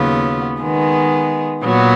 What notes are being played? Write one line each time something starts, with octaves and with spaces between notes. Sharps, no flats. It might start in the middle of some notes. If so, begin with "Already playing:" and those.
Already playing: D#2 C#3 F#3 B3 F4
D#3 G#3 B3
A#2 F#3 B3